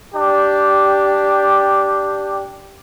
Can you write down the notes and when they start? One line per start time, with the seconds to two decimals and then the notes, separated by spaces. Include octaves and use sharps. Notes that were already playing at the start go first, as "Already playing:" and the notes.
0.14 D4 G4